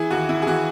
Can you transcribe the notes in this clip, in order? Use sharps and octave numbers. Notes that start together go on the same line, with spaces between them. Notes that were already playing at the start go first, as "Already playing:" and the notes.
Already playing: E3 E4 G#4
D#2 F#4
E4
G#4
E3 F#4